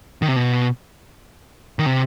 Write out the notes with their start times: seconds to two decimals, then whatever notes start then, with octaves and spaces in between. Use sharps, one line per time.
0.22 D#3
0.28 C3
0.36 B2
1.79 D#3
1.86 C3